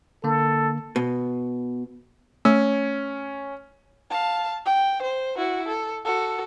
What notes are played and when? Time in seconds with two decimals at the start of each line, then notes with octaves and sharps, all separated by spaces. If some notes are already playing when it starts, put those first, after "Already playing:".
0.24 D3 A#3 A4
0.96 B2
2.45 A3 C#4 E6
4.11 F5 A5
4.65 G5
5.02 C5
5.37 E4 F#4
5.68 A4
6.05 F#4 A4